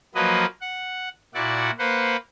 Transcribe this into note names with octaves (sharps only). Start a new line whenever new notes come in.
F3 F#3 A#3 B4 D#5
F#5
A#2 E4 F#4 D5 F#5
A#3 B4 C5 F#5